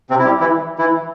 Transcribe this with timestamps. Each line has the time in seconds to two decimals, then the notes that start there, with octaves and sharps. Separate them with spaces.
0.10 C3 C4
0.19 E4
0.25 G3 G4
0.40 E3 E4
0.79 E3 E4